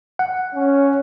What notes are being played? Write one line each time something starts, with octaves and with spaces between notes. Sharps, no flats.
F#5
C#4